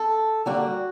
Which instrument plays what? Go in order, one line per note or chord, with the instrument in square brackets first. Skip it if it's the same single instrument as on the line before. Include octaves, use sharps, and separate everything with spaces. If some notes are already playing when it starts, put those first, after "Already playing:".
Already playing: [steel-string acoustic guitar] A4
D3 G3 A#3 F#4